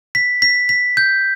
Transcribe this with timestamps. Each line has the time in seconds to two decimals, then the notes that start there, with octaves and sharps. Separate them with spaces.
0.15 B6
0.42 B6
0.69 B6
0.97 G6